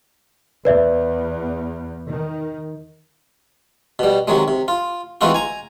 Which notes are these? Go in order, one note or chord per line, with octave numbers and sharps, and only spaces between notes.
E2 B4 D5 E5
D#3
B2 G3
C3 D#3 F#3 G#3
C3
F4
E3 G#3 C4 D#4 F4 F#4
G#5 A#5